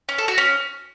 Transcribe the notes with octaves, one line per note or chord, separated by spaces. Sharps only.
C#4
A4
F#4
C#4